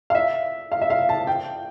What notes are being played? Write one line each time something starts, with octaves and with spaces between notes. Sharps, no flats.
F5
E5
F5
E5
F5
A5
G5